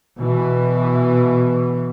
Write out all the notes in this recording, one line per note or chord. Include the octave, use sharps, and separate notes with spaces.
B2 E3